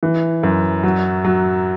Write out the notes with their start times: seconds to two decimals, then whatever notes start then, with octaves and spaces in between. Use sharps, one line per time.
0.03 E3
0.43 F#2
0.83 F#3
1.24 F#3